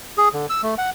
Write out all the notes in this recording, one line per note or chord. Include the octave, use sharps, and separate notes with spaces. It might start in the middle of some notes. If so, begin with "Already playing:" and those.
G#4
D3
E6
A3
F#5